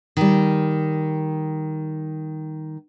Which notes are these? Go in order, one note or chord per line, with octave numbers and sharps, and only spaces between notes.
D#3 G3